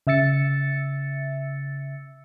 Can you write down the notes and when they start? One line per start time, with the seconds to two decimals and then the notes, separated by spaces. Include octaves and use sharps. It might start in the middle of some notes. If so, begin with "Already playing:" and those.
0.07 C#3 E5 E6 A6 C#7